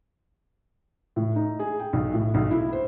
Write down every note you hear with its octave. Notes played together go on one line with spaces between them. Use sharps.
A2
D#4
G#4
G5
B1
A2
B1
E4
C5